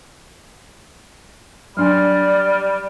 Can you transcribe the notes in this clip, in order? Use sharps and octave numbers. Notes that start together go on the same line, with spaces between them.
F#3 G3 D4 D5 G#5 F6